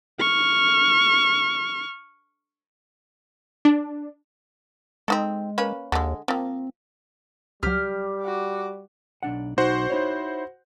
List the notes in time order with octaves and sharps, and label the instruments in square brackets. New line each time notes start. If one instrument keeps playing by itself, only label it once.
[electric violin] C#6 F6
[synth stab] D4
[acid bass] G#3 [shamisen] C4 D#4 A4
[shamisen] A#3 C#4 B4
[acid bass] D#2 [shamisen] D3 G#3
[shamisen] F3 A#3 [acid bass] C4
[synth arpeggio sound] C#2 F#3 [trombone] G3 [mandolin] G4 F6
[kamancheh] F#4 D6
[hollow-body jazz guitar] B1 D4 F#5
[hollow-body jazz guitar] B1 D#4 [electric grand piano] F#4 C5 F#5
[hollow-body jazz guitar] D#4 E4 C#5